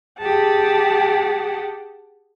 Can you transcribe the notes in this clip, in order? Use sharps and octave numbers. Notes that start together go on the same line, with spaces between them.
G4 G#4 F#5 A5